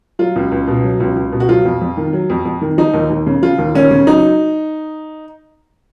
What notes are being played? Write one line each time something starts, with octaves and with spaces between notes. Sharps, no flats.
F#3 F4
C#2
C#2
B2
F#3
C#2
C#2
B2
F#4
F#3 F4
F2
F2
D#3
F#3
F2
F2
D#3
F3 D#4
D#2
D#2
C#3
F3 F4
D#2
D#2 C#4
C#3
F#3 D#4